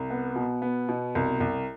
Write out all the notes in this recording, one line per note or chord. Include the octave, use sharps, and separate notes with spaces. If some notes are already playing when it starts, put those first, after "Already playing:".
Already playing: C2
B3
B2
B3
B2
C2
C2